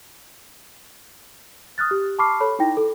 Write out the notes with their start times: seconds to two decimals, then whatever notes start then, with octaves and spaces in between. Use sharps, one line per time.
1.78 D#6 F6 F#6 A6
1.91 G4
2.19 A5 B5 C#6 D6 F6 C7
2.40 A4 C#5 B5
2.59 D#4 E4 G5 A#6
2.77 A4